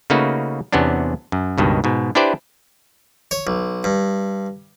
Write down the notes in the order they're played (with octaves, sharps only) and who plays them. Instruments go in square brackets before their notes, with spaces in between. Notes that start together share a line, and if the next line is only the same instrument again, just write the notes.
[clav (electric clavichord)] C#3 A3 A#3 D#4 F#4 B4
E2 C3 B3 C#4 D4
F#2
C#2 G2 B2 D#3
G#2 B2
D4 E4 G4 B4 C5 D5
[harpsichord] C#5
B1
G2